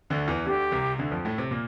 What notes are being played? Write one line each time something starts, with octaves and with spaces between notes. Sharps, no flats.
D2 D3
E2 E3
D2 D3 G4
C2 C3
D2 D3
F2 F3
A2 A3
C3 C4
A#2 A#3